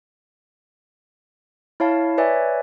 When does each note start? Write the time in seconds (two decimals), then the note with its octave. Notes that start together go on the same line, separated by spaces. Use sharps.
1.80 E4 C#5 F5 A5
2.18 B4 C#5 D5 E5 G#5